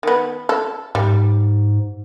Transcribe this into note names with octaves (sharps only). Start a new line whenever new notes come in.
D#3 B3
A4
G#2 G3